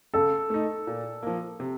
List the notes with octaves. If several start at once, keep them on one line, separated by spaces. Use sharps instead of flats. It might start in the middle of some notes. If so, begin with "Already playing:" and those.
C#3 A4
A3 D#4
A#2
F3 A#3
C3